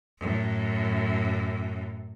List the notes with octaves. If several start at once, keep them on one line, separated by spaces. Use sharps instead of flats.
F#2 A2